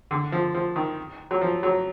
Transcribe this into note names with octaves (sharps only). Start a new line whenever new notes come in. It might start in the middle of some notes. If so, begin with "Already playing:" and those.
D3
F3
F3
D#3
F#3
F3
F#3